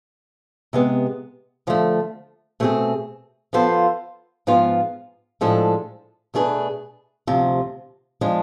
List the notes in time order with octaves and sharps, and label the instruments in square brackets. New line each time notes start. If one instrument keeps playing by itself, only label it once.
[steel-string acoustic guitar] C3 G#3 B3
D3 F3 A3
B2 A3 C4 G#4
F3 B3 F4 A4 C5
G#2 F3 B3 F4
A2 F3 G#3 D4 A4
B2 A3 D4 G#4 B4
D2 C3 F3
F3 G#3 D4